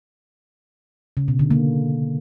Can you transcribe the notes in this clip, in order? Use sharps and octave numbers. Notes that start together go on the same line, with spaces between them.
C#3
B2
D3
A#3